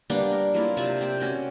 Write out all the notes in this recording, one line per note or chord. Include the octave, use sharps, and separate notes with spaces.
G3 A#3 B3 D4
A#4
F#3 A#3 E4 F4
C3 F4 D5 E5
C4 C5 G5
C#4 F#4 G5